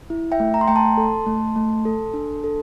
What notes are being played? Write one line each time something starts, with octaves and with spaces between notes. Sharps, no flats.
E4
E5 G5
A3
A#5
C6
A3 G5 A#5
A5 C6
A4
A3
A3
A4
D4
A4